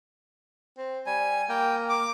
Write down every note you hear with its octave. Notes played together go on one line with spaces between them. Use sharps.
C4
G3 G#5
A#3 G5
D6